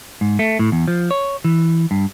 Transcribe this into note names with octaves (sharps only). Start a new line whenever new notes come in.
G#2
A3
A2
E2
F3
C#5
E3
G2